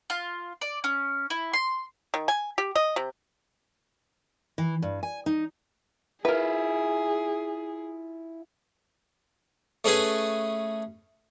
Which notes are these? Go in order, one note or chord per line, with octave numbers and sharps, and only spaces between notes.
F4
D5
C#4
E4
C6
D#3
G#5
G4
D#5
C3
E3
G2
G#5
D#4
E4 F4 G#4 A#4 B4
A3 C#4 G#4 B4 G#5